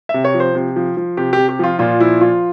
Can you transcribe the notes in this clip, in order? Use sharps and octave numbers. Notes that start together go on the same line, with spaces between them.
C3 E5
C#5
F3
C5
C3
F3
F3
C3 G4
G4
C3
G4
F3 F4
A#2 F4
F3 E4
F3 F4